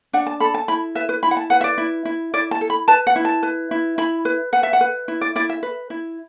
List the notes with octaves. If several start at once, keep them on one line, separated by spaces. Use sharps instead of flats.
D4 F#5
A5
A4 B5
A5
E4 B5
B4 E5
B4
E4 B5
F#5
A5
B4 F#5
E5
D5
E4
E4
E4 D5
A5
A4
B5
B4 A5
F#5
E4
A5
B4
E4
E4 B5
B4
B4 F#5
E5
F#5
B4
E4
D5
E4 D5
E5
B4
E4